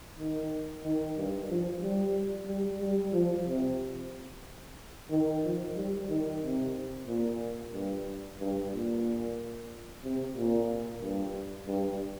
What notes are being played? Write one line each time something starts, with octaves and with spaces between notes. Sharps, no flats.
D#3
D#3
G2
F3
G3
G3
G3
F3
C3
D#3
F3
G3
D#3
C3
A#2
G2
G2
A#2
C3
A#2
G2
G2